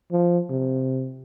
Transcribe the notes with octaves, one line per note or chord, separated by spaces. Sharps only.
F3
C3